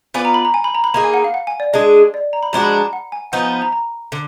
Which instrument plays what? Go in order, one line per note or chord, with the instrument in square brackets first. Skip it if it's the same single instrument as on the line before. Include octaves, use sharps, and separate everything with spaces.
[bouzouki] B3 F4 B4 D5 [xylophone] G#5
[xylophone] A#5
B5
A#5
G#5
B5
A#5
B5
[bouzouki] A#3 D#4 G#4 [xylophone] A#5
[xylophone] G#5
F#5
F5
F#5
G#5
D5
[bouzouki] G#3 D4 G#4 [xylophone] D#5
[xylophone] D5
A#5
B5
[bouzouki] F3 G#3 D4 F#4 [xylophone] A#5
[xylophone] B5
A#5
F#5
G#5
[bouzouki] F3 B3 D#4 [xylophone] F#5
[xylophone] G#5
B5
A#5
A#5
[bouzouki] D3